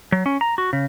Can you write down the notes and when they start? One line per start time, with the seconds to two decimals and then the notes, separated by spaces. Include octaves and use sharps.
0.12 F#3
0.26 C#4
0.41 A#5
0.58 F#4
0.73 C#3